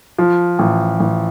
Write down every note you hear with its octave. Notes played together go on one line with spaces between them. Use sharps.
F3
A1
A1